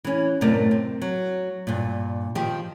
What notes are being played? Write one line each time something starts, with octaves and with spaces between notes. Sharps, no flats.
E3 C#4
F#2 A2 C3 A3 A#4 D5
C4
F#3
G2 A#2
D#3 F3 G4